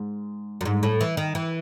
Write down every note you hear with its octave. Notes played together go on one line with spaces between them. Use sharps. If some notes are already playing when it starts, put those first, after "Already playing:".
Already playing: G#2
F#2
G#2
A2
E3
D#3
E3